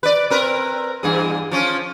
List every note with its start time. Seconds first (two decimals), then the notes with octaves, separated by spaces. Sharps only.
0.03 B4 D5
0.30 C4 A#4 B4
1.03 E2 G2 G#4
1.51 F3 C#4